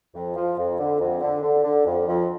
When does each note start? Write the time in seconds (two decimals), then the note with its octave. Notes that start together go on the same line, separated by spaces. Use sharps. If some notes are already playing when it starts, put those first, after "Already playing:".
0.14 F2
0.36 F3
0.58 F2
0.79 D3
1.00 F2
1.21 D3
1.43 D3
1.64 D3
1.85 F2
2.07 F2